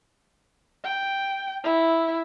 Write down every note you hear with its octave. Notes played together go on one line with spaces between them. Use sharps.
G5
E4